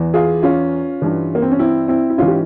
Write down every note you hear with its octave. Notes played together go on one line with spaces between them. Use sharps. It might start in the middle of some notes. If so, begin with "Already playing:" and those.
Already playing: E2 E3
F4 G#4
C#4 F4
G2 E3
A#3
C4
C#4
C4 E4
C4 E4
E4
G#2 E3 C#4 F4
G4